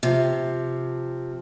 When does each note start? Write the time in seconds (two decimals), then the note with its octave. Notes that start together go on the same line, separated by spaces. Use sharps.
0.03 C3 F3